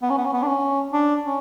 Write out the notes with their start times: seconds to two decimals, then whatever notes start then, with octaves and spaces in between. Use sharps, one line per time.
0.02 B3
0.10 C#4
0.18 B3
0.26 C#4
0.33 B3
0.43 D4
0.48 C#4
0.93 D4
1.24 C#4